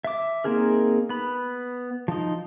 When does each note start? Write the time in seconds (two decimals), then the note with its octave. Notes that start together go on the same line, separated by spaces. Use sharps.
0.04 E5 D6
0.44 A#3 C4 D#4 G#4 A#4
1.09 B3 B5
2.08 F3 D#4